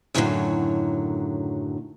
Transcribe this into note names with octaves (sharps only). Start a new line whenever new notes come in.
F#2 A2 D3 D#3 F3 F#3